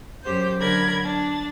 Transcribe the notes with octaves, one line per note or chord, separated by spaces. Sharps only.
F#2 G4 C5 G6
D3 F#3 A#4 B5 G#6 A#6
D4 A6